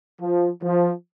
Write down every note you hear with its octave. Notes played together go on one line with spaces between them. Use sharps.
F3
F3